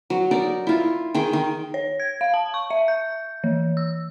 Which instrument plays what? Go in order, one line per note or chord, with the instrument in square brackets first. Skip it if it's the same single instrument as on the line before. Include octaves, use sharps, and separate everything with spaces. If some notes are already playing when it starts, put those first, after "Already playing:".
[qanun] F#3
D#4 A#4 D5
E4 F4
D#3 G#4 G5
D#3
[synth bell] C#5
G#6
F5
A5
C#6
E5
G6
E3
E6